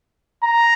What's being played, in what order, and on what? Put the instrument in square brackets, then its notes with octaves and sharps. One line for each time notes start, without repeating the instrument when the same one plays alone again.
[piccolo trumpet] A#5